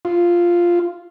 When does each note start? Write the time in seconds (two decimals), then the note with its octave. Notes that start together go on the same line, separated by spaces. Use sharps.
0.05 F4